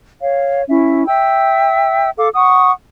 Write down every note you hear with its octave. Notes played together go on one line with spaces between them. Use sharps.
C#5 F5
C#4 E4 E5
E5 G5 E6
A4 F5 D6
F#5 C#6 D#6